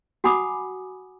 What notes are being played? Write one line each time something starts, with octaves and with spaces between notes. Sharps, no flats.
F#4 F#5 G#5 B5 D6 D#6